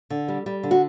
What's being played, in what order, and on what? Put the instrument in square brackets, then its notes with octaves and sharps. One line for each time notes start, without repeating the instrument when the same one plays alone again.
[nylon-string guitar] D3
G3
G3
D3
F#4